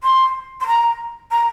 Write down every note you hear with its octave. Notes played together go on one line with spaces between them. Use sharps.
C6
C6
A#5
A#5